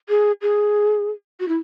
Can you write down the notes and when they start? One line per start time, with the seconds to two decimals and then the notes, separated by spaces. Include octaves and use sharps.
0.09 G#4
0.42 G#4
1.40 F#4
1.48 E4